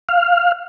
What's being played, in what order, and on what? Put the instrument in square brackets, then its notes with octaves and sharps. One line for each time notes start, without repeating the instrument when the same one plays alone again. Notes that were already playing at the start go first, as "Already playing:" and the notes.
[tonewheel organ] F5